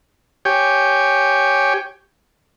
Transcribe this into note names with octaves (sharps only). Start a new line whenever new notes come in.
G4 C#5 G5 G#5